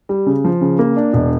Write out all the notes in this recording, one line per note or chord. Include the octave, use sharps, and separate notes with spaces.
G3
C#3
F3
C#3
A#3
D4
E1